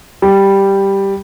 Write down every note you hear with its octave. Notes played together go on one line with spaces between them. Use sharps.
G3